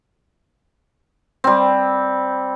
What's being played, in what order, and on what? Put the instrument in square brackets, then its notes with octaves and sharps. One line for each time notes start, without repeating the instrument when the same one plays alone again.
[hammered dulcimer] G3 C4